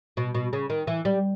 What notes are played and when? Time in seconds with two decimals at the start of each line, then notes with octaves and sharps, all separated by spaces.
0.17 B2
0.34 B2
0.53 C#3
0.70 D#3
0.87 E3
1.05 G3